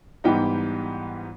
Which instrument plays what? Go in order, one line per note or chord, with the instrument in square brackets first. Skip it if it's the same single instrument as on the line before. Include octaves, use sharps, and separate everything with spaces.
[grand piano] G#2 E3 G3 B3 D#4 G5